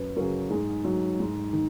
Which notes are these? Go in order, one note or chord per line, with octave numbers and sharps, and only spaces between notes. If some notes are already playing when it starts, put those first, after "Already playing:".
Already playing: F#2 B4
C#3 F#3 A#4
G#2 G#4
F#3
G#2
D#3